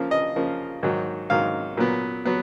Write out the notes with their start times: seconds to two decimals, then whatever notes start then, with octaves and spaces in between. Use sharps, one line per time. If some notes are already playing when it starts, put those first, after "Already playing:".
Already playing: C#3 F3 A#3
0.11 D#5
0.36 C#3 F3 A#3
0.83 G#2 D#3 F#3
1.30 G#2 D#3 F#3 F5
1.77 A#2 F#3 B3
2.25 F#3 B3